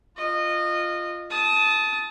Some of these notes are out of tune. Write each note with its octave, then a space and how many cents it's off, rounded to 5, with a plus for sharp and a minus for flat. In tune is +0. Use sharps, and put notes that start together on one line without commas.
F4 +0 D#5 -20
A5 -15 D#6 +20